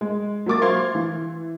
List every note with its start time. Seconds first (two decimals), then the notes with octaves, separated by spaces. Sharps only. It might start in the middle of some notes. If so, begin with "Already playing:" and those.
0.01 G#3
0.46 F#3 A#3 D6 A6
0.61 C5 F5 C6 G#6 A6
0.95 E3